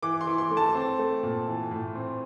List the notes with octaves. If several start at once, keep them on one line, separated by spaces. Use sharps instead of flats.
E3 D6
C6
E3
C6
A3
A5
C4
A3
A#2
E3
A2
C4